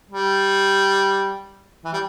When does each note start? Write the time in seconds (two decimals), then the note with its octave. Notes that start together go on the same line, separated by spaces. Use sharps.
0.11 G3
1.85 E3
1.93 G3